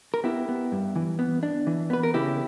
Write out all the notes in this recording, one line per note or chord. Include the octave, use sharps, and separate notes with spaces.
A#4
B3 E4 G4
B3
G2
E3
B3
D4
E3
B3 B4
A#4
C#3 E4 G4